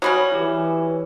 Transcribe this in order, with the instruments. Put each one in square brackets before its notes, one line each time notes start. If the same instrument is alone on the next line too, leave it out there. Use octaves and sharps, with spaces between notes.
[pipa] F#3 G3 C#4 [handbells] B5 D#6 G#6
[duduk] E3 [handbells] E4 G4